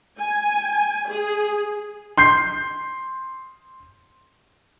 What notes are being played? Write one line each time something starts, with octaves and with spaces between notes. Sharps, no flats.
G#5
G#4
C6 G6 C7